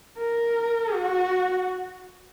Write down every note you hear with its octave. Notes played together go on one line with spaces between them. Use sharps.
A#4
F#4